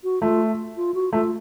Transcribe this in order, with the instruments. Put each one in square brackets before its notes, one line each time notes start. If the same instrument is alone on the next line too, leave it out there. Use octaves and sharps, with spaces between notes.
[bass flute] F#4
[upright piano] A3 [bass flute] F4
[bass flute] F4
F#4
[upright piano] A3 [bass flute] F4